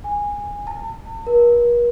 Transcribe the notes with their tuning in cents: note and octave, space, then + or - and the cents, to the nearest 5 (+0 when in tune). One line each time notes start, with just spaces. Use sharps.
G#5 -15
A5 +45
A#4 +45